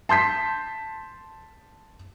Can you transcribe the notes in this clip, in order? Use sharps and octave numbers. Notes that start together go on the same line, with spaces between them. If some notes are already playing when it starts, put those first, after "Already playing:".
A5 C6 G6 B6